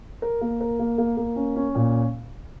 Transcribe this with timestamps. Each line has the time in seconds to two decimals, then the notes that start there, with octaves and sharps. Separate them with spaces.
0.22 A#4
0.41 A#3
0.61 A#4
0.79 A#3
0.98 A#3
1.17 A#3
1.36 C#4
1.56 C#4
1.75 A#2